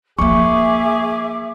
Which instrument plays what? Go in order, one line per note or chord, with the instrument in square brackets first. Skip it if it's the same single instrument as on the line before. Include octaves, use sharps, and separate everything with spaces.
[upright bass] F3 A#3 [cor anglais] G#4 [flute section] E5 D6 [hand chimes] C#6